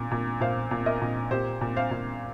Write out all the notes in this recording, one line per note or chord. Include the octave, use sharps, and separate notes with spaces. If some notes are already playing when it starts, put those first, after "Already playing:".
Already playing: A#2
A#2
A#2 C5 F5
A#2
A#4 D#5
A#2
A#2 G4 C5
A#2
C5 F5
A#2